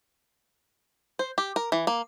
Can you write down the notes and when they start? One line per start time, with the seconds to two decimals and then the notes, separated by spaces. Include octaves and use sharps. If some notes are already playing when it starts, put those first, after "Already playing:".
1.19 C5
1.38 G4
1.56 A#4
1.72 E3
1.87 A#3